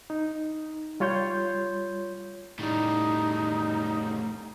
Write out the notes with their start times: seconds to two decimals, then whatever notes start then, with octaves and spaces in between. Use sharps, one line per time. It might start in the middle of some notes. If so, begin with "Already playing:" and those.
0.10 D#4
1.00 G3 F4 C#5 C6 G6
2.59 A2 G3 D#4